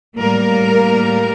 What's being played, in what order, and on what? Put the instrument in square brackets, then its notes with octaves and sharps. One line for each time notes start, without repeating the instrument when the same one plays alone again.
[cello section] A2 G3 A#3 A#4